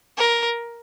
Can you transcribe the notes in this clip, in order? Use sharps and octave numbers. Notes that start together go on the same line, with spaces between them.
A#4